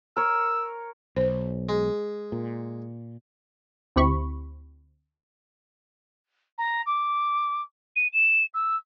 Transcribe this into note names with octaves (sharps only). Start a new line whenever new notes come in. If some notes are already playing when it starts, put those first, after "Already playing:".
A#4 C#5 E6
B1 C5
G#3
A#2
D2 C4 E4 G4 B5 C#6
A#5
D6
D#7
E7
E6